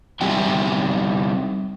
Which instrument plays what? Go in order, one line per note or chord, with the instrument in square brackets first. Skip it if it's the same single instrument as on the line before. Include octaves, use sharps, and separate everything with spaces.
[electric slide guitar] G3 C4 D#4 E5 G5 G#5